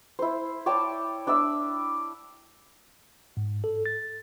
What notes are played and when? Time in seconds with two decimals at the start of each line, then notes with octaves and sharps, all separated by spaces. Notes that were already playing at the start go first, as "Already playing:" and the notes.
0.19 E4 C5
0.66 C#5 D5 G5 A5
1.27 D4 D5 E5 E6
3.37 G#2
3.64 A4
3.86 A6